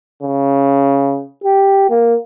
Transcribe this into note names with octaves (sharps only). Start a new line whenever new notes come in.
C#3
G4
A#3